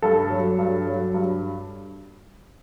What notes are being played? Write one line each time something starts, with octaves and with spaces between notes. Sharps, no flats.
G2 A4
F#3
G2
F#3
G2